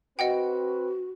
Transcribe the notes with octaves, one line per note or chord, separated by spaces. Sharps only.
C4 F#4 B4 D#5 F#5 G5